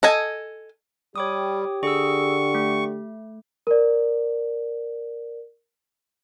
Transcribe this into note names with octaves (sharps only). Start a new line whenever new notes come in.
A4 D#5 G#5
G3 G4 C#5 D6 D#6
D3 G#4 C#6 E6
A3
A#4 D5